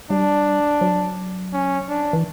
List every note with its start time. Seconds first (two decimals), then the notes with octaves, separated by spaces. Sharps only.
0.10 G3 D4
0.81 F#3
1.53 C#4
1.89 D4
2.13 E3